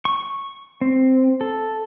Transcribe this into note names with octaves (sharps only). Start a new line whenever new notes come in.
C#6
C4
A4